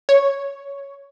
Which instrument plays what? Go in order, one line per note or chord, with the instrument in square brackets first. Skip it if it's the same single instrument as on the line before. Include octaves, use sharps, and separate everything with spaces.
[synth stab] C#5